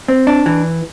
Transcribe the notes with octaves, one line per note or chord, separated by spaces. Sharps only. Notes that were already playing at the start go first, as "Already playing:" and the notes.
C4
D4
E3